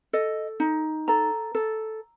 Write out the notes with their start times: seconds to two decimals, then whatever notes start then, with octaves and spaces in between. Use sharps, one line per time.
0.13 A4 D#5
0.60 D#4
1.08 A4 A#5
1.55 A4